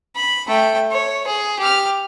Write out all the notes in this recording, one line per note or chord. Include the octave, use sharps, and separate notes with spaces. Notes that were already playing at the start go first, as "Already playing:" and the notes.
B5
A3 G5
C#5
G#4
G4 F6